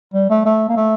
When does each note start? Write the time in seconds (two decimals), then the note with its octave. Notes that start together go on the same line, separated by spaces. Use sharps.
0.14 G3
0.30 A3
0.45 A3
0.69 A#3
0.76 A3